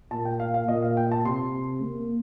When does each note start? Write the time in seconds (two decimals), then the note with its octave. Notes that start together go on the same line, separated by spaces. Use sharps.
0.11 A#2 A5
0.25 G5
0.40 F5
0.54 F5
0.68 A#2 D#5
0.82 F5
0.97 G5
1.12 A5
1.25 C3 C6
1.83 A#3